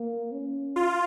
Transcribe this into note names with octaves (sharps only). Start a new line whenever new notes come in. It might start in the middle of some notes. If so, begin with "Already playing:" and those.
Already playing: A#3
C#4
F4